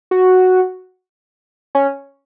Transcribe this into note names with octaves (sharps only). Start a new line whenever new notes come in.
F#4
C#4